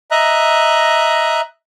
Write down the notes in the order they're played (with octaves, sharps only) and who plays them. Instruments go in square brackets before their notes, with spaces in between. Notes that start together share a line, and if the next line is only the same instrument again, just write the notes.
[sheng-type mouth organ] D#5 E5 A#5 F#6